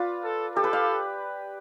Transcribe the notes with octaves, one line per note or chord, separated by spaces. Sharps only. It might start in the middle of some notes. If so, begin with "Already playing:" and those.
Already playing: F4 B4 D5
A4
G4 A4
B4
F5